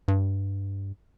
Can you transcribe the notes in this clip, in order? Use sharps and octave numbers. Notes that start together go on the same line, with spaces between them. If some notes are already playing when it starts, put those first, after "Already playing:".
G2